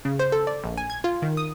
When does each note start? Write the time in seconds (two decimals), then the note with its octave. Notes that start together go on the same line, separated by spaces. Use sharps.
0.05 C#3
0.19 C5
0.32 A4
0.47 D5
0.64 A#1
0.78 G#5
0.90 G#6
1.04 F4
1.22 D#3
1.37 D#6